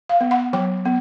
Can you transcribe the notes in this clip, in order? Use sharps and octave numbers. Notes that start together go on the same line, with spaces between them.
F5
B3
F#5
F#3 G5
B3